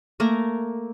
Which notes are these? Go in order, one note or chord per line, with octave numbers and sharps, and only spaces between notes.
A3 A#3 A#4 A#5